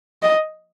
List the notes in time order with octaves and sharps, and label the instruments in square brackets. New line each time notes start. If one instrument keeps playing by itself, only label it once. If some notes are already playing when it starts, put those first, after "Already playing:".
[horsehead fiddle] D#5